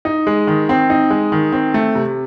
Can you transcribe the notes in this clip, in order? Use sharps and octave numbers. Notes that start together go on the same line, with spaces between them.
D#4
G#3
D#3
C4
D#4
G#3
D#3
C4
A3
C3